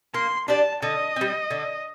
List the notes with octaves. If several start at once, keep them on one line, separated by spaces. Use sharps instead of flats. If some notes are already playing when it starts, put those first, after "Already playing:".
A#3 C6
D4 G4 D5 A5
D3 D#5
G3 C4
D3